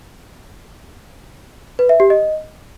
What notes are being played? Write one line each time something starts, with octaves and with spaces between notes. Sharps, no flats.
B4
E5
G4
D#5